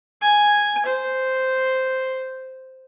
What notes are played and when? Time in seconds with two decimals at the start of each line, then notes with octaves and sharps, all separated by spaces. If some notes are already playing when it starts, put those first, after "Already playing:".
0.22 G#5
0.86 C5